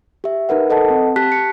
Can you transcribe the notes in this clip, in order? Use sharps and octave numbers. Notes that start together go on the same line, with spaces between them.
G4 E5
D#4 A#4 B4 F#5
A4 D#5 F#5 A5
C4
G4 A5 F#6 B6
C#7